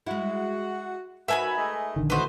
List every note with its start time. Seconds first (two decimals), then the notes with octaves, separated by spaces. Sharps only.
0.07 G#3 E4 F#4
1.28 D#4 F#4 A#4 B4 E5 G#5 B5
1.56 G#3 A3 D#5
1.96 A#1 D3 D#3
2.10 E3 A3 B3 E4 F#4 B4 C5 D#5